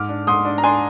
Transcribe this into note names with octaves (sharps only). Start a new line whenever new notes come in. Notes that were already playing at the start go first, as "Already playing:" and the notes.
Already playing: G#2 D6 F6
D4
G#2 C6 D#6
D4
A#5
D4 G#5 C6